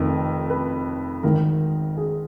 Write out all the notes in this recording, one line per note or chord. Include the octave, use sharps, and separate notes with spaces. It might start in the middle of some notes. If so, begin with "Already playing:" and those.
Already playing: F1 F2 D#3 A#4
B4
G#1 G#2 D#3 A#4
G#4